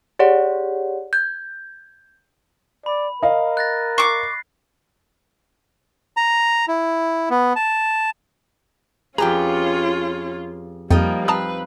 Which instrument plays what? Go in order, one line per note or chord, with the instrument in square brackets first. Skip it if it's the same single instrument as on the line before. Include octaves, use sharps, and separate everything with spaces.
[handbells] G4 G#4 C#5 D5 F#5
G6 G#6
[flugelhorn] D5 [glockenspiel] B5
[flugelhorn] A#4 [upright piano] D#5 F5
[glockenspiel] F#6 A6 A#6
[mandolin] C#6 D6 [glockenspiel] C7
[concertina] A#5
E4
B3
A5
[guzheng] F2 G4 B4 [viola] C#4 F4 [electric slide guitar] G#4 G5 [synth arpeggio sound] A#5
[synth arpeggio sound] F2 [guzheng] F3 D#4 [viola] G3 A#3
[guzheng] C4 [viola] B4 [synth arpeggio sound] A5 A#5 D#6